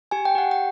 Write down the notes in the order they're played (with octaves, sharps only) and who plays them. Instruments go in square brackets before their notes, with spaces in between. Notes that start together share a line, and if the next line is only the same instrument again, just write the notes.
[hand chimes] G4 G#5
G5
G4 F#5
G5